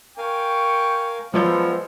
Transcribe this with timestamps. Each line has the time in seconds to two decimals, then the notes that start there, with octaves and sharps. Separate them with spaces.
0.18 A#4 F5 G5 G#5 C#6
1.34 F3 F#3 G#3 B3 A4 C5 D5 G6